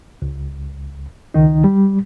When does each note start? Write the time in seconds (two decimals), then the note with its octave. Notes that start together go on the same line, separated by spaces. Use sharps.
0.22 C#2
1.34 C#2 D#3 D#4
1.64 G3